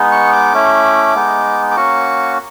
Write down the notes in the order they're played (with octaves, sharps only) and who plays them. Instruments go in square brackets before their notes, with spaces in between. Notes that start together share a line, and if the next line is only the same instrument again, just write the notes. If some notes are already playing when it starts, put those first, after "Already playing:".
Already playing: [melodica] G#3 B3 D#4
C#6
D6
A3 C#4 E4
G#3 B3 D#4
D6
A#3 C#4 F#4 C#6